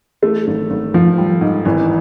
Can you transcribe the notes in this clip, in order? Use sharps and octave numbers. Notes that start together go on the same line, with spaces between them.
E3 A3
G#1
G#1
G#1 F3
G3
G#2
G#1 E3